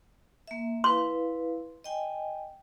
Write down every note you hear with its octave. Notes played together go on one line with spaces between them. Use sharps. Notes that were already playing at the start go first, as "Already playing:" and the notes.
A#3 E5
E4 B4 F5 C6
D#5 G5 G#5